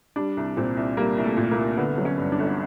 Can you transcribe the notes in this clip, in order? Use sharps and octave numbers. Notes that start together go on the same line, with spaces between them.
G3 D4
C2
A#2 C4
C2
G3 A#3
C2
A3
A#2
A#3
C2
D3 B3
F#3
C#4
G2
D4
G1